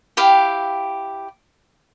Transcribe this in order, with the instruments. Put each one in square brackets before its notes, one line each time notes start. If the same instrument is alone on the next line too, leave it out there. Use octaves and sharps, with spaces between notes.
[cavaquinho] E4 G4 F5 G5